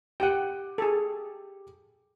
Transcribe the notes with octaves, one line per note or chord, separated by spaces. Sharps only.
G4 F#5 G5 D#7
G#4 A4